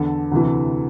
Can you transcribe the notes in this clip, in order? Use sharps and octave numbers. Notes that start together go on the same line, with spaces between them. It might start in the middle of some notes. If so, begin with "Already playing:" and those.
Already playing: E2 D3 A4
D2 C3 E3